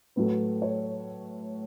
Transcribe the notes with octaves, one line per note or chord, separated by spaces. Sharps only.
A2 F#3 A3 B4
C#5